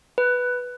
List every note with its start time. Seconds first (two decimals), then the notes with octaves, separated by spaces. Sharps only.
0.18 B4